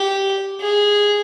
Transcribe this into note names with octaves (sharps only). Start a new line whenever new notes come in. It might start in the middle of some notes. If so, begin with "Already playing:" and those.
Already playing: G4
G#4